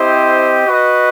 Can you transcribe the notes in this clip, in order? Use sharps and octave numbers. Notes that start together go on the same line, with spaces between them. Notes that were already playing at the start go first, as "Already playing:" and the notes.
Already playing: C4 E4 G4 C5 D#5
F#4 B4 D#5